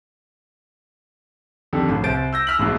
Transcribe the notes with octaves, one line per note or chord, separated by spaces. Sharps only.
F2 D3 D#3 G3
A1 F3
C2 C5 A6 D7
E6 G6 A#6
E6 F6 B6 F#7
A1 G#2 B2 E3